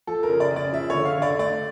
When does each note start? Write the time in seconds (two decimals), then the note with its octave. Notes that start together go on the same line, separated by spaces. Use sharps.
0.07 F3 A4
0.23 A#4
0.29 C#3
0.40 D5
0.51 C#3
0.56 D5
0.72 F3 E5
0.90 D3 C#5
1.05 F5
1.17 D3 D5
1.39 A3 D5